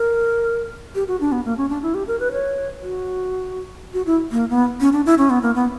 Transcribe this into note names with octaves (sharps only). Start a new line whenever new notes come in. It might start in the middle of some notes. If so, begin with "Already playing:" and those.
Already playing: A#4
G4
F#4
D4
B3
A#3
C#4
D4
E4
G4
A#4
B4
C#5
F#4
F#4
E4
A#3
B3
C#4
D4
E4
C#4
B3
A#3
B3